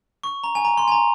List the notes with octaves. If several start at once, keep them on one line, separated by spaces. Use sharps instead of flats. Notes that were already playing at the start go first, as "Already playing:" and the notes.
C#6
A#5
G#5
A#5
C6
G#5
A#5